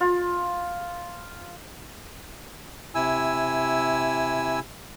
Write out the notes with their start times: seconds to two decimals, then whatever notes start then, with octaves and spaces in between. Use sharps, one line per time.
0.01 F4
2.95 C3 E4 G#5 E6